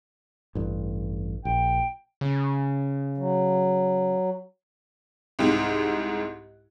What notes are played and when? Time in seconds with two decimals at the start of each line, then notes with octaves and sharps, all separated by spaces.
0.55 A1 G2
1.45 A#1 G5
2.21 C#3
3.18 F#3
5.39 C2 G#2